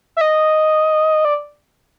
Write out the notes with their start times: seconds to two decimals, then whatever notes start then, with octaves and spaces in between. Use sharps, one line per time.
0.17 E5
0.21 D#5
1.25 D5